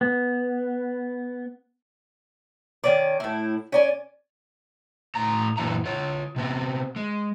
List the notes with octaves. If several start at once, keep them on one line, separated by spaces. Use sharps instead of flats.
B3
D#3 C#4 D5
A2 E4
C#4 D5 G#5
A2 A#5
F#2 A#2 E3 D4 E5 A#5
F4 C#5
C3 B3 C4
G#3